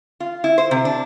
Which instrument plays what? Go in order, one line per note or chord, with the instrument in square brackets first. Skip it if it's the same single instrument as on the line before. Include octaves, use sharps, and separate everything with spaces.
[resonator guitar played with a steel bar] F4
E4
C5
C3
D4